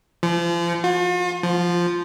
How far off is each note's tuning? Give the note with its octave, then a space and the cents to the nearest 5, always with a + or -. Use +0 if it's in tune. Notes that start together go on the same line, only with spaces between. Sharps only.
F3 -35
F4 +45
F3 -5